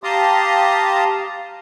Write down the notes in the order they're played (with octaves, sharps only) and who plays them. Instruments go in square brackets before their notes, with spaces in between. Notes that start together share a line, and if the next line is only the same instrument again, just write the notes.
[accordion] G4 F5 A5 A#5 C6 D#6